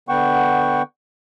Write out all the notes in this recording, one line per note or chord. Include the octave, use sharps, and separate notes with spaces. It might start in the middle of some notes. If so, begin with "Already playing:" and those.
D3 B3 F#5 G5 C#6